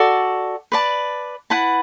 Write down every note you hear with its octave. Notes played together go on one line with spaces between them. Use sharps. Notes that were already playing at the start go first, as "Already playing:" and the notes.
Already playing: F#4 A4 D5
B4 D5 A5
E4 B4 F#5 A5